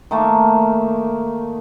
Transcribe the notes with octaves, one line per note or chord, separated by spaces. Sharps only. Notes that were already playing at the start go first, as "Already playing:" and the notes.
D#3 A3 A#3